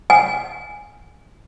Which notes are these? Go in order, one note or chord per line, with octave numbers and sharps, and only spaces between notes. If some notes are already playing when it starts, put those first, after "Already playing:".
G#5